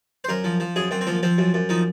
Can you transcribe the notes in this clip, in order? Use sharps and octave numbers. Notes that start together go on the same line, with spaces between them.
C5
F#2 A#4
F3
F3
F#2 G#4
F#2 C4
C4
F3 A#3
F3 C4
F#2
F#2
F3 D#4